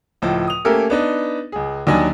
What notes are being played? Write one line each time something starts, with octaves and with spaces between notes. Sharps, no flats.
C#2 A2 F3
D#6 F7
A3 A#3 C#4 G4 A4 A#4
B3 D4 D#4
C#2 G#4
D#2 D#3 F#3 D4 D#5 G#5